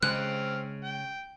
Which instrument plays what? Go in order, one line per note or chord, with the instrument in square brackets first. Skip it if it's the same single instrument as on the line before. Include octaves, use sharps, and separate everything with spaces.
[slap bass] C#3 [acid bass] G#3 [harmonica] C4 F6 [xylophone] F#6
[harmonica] G5